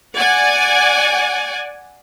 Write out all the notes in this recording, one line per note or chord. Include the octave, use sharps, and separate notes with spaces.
D5 F#5 G#5